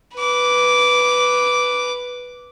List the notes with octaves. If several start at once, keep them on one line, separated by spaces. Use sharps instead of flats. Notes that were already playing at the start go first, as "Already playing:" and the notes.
B4 D6